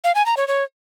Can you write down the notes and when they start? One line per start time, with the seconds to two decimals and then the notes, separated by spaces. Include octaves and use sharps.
0.04 F5
0.15 G#5
0.26 A#5
0.37 C#5
0.48 C#5